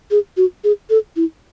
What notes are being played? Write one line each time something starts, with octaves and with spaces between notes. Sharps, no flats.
G#4
F#4
G#4
A4
E4